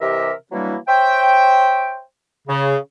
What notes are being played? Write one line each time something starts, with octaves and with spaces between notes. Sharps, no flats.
C3 E3 G4 A#4 D#5 E5
E3 F#3 G3 A#3 D4 E4
C5 C#5 E5 G5
C#3